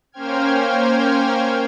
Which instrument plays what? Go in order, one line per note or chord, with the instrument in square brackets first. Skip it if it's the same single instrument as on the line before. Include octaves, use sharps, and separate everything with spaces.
[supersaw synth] A#3 C#4 C5 G5 F6 G#6